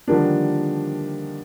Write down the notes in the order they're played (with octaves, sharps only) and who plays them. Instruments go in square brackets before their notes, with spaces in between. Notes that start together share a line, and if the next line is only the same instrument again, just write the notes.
[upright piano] D3 D#3 F3 G3 A#3 D4